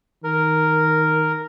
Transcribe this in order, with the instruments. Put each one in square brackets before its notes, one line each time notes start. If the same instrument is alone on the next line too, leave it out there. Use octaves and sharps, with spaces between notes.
[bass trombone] D#3 [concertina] A#4